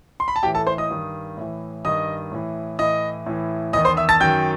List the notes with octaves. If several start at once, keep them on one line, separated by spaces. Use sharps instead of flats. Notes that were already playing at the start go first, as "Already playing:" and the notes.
C6
B5
A5
A2 E3 G4 G5
A4 A5
C5 C6
D#5 D#6
G2 D#3
A2 E3
G2 D#3 D#5 D#6
A2 E3
A2 E3 D#5 D#6
A2 E3
E2 D#3 D#5 D#6
C5 C6
E5 E6
A5 A6
F#2 D#3 G5 G6